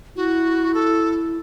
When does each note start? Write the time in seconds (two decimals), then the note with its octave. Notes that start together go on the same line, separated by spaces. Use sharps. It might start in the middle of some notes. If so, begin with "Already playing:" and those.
0.16 E4 F#4
0.74 A4